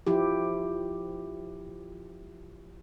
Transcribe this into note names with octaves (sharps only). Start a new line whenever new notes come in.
F3 E4 G4